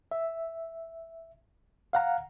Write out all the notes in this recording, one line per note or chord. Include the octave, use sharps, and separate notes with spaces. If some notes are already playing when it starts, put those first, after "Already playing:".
E5
F5 F#5 A#5